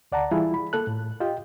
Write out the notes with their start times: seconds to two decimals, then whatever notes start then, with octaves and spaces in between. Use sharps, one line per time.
0.12 D2 D5 F#5 A5 A#5
0.31 E3 G3 E4 F4 G#4
0.54 B5
0.73 A#3 A4 F#6
0.87 A2
1.20 F4 G4 D#5 G5